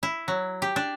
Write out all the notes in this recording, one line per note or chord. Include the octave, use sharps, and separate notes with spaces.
E4
F#3
G4
D4